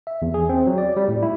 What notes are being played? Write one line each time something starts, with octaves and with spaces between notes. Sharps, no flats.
E5
E2
G#4
C4
F#3
D5
G3
A2
E4